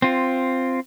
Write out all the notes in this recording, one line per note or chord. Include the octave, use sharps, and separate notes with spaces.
C4 F4